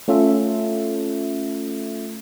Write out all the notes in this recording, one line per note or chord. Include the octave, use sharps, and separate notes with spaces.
A3 C#4 F4 A4 E5